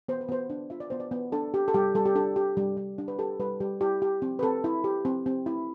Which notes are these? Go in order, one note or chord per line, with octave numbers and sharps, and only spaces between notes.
B3 C5
B4
B3 C5
D4
F4 E5
D5
B3 C5
D5
B3
D4 A4
G4
A4
G3 G4
G3 A4
G4
D4 A4
G4
G3
G3
D4
B4
G4 A4
G3 B4
G3 G4
E4 G4
G4
C4
B4
C4 A4
E4
G4
C4
C4
E4